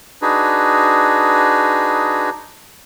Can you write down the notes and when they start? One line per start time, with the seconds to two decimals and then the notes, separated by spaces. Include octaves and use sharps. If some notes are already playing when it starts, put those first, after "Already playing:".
0.22 D4 D#4 F#4 G#4 B4